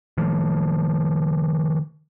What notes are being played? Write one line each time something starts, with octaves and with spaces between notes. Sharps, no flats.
D#3 F3 A3